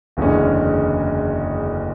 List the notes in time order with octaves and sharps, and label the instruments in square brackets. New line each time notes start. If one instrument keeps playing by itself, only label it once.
[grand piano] F#1 E2 D3 G#3 C#4